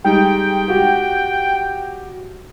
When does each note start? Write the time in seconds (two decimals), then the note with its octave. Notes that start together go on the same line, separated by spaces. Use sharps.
0.04 G3 G#3 D#4 G5
0.68 F#4 G4